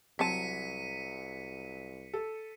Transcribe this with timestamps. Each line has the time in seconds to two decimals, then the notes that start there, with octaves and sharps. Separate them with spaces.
0.19 C2 F#3 C4 A5 B6 C#7 D#7
2.14 A4